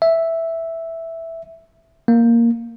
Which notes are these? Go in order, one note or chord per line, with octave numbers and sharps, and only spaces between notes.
E5
A#3